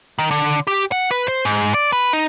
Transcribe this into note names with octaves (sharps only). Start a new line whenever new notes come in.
D#3
D3
G4
F#5
B4
C5
G#2
D5
B4
D#4